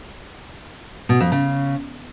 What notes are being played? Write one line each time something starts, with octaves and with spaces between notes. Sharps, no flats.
B2
F2
C#3